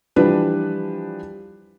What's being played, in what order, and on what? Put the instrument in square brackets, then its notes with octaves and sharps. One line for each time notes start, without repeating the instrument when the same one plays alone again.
[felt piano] E3 F3 G3 D4 B4